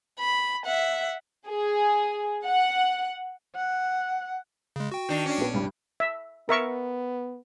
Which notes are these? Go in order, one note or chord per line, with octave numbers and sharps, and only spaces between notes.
B5
E5 F#5
G#4
F#5
F#5
C#3 G#3
F#4 G5
D#3 D4
C#4 D4
A#1 B3
C2 G2 G3
E5
B3 A#4 E5 C#6